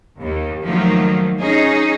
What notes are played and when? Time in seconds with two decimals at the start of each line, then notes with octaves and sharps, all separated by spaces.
0.20 D#2
0.64 D#3 F3 F#3 A3 A#3
1.40 C#4 D#4 G#4